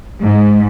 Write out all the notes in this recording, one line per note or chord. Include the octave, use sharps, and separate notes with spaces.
G#2